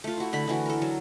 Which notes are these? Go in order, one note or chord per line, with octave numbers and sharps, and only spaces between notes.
A3 F4
E4 F#4
D3 A3 B5
D3 E3 F#4
A4 A#4
F#3